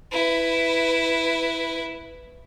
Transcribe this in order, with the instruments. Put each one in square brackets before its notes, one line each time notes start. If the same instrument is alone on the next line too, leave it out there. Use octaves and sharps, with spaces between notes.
[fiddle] E4 B4